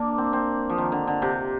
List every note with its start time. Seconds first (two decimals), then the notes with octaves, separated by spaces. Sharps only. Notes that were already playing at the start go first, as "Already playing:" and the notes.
Already playing: A#3 D4
0.18 C4
0.33 C4
0.70 F3
0.78 D#3
0.92 D3
1.07 D3
1.22 C3